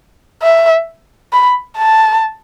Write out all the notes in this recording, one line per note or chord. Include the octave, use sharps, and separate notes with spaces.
E5
B5
A5